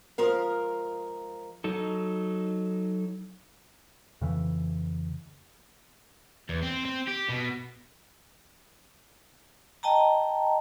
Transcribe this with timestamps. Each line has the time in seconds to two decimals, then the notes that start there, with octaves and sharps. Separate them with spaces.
0.18 F3 G#3 A#4 F5
1.64 F#3 D#4 A4
4.21 F2 C#3 E3
6.49 E2
6.63 C4
6.85 C4
7.08 G4
7.30 B2
9.83 D#5 G5 A5 A#5